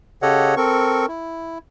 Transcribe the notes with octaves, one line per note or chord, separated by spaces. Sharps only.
C#3 G4 A4 C#5 D#5 F#5
C4 A4 A#4 C#6
E4